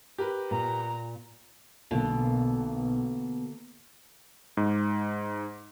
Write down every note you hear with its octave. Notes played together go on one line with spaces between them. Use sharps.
G4 A#4 B4
A#2 A#5
B1 B2 D3 A#3 A4
G#2